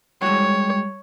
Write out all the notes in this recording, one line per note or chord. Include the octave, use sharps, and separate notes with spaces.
G3 G#3 F#4 C#5 F#5